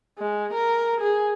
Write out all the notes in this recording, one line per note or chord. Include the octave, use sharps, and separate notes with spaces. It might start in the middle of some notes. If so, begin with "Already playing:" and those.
G#3
A#4
G#4